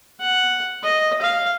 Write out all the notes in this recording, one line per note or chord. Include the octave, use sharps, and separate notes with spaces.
F#5
D#5
F5